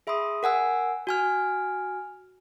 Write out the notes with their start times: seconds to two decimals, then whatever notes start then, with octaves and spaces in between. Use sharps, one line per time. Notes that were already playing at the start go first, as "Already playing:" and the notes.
0.07 G#4 E5 B5 C6 D#6
0.43 A#4 F#5 G#5 E6
1.07 F#4 G#5 F6